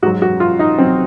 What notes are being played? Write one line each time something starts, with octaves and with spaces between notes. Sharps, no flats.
G#2 F#3 F#4
F#4
F4
D#4
F#3 C4